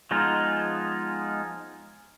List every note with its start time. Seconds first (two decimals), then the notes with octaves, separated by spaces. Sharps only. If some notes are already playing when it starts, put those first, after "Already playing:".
0.11 F3 G#3 B3 D#4 F4